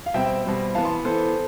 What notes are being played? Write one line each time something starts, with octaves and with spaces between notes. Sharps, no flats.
F5
B2 G3 C4 E5 G5
B2 G3 C4
E3 B3 F5 A5
A5 C6
E3 B3 A4 C5